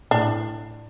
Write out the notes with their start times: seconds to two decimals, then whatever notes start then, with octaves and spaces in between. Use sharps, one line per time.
0.11 A2 D4